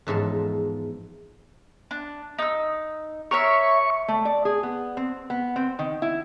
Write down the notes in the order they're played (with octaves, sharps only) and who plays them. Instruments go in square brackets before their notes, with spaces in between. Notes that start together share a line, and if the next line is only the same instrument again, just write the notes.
[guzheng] E2 G#2 F3 A4
[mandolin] D4
D#4 E6
[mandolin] A#4 C#5 E5 [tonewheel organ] C#6
[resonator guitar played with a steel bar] A3
D5
G#4
B3
C4
B3
C4
D#3
E4